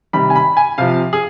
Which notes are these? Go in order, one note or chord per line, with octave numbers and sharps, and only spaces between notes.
C3 D#3 G3 B5
G#5
B5
G#5
C3 F3 F5
G#4